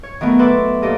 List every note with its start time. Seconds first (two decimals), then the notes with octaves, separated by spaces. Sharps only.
0.03 C#5
0.21 D#3 F#3 A3 B3
0.39 A4 B4 E5 C6 D6
0.82 A#2 G4 A4 D#5